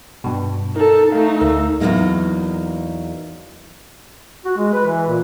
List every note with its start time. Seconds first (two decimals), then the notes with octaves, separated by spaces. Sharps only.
0.24 G2 B2
0.76 D#4 A4 A#4
1.12 A3 D#4 F5
1.41 D2 A#4 E6
1.80 E2 G2 F#3 A#3 D#4
4.45 F#4
4.57 G#3
4.73 B4
4.85 E3
5.08 A#2